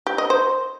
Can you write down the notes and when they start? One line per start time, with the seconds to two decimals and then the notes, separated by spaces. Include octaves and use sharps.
0.07 G4
0.18 D#5
0.30 C5